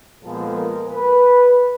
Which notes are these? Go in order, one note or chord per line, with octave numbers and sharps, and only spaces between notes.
A#2 F3 G#3 B3 A4
A#4
B4